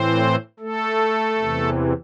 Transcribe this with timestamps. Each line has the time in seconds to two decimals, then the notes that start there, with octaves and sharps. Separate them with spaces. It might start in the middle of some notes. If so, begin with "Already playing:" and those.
Already playing: A2 E3 C4 C5
0.59 A3 A4
1.38 E2 C3 E3